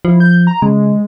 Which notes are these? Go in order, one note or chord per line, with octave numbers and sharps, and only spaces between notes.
F3 E4
G6
A#5
C#3 G#3